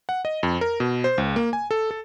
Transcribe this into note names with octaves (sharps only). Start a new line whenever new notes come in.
F#5
D#5
F2
A#4
B2
C5
C#2
A#3
G#5
A4
A4